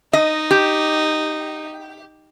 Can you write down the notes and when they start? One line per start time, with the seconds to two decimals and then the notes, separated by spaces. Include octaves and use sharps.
0.13 D#4 D#5
0.51 G4